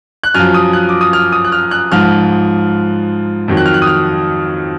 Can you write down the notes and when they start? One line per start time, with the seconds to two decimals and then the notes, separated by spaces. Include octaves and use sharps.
0.23 F#6
0.34 F#2 F3 F6
0.54 D#6
0.73 F#6
0.89 D6
1.01 D#6
1.13 F6
1.32 D#6
1.44 F#6
1.52 F6
1.71 F#6
1.92 G#2 F3 F6
3.48 F2 D#3 F#3
3.57 F#6
3.66 F6
3.74 F#6
3.82 D#6
3.87 F6